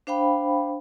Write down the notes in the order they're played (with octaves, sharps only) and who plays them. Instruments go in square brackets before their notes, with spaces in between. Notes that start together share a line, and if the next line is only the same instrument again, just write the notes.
[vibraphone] D4 C5 F5 G5 B5